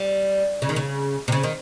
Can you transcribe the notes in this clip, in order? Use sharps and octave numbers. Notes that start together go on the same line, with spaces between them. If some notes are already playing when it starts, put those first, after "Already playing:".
Already playing: G3
C#3
D#3
C#3
C3
C#3
D#3